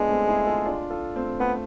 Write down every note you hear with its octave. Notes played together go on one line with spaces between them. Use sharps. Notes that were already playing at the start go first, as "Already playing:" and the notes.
Already playing: G#3 B3 D4 F4
A3 C4
E4 G#4
F4 A4
D4 F4
F4 A4
A3 C4
A3 B3